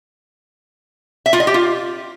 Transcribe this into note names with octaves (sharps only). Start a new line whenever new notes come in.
E5
F4
D#5
G4
F4